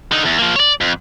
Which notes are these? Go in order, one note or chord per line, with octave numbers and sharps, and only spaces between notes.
D3 D#4
E2
F3 A#3
C#5 D5
F2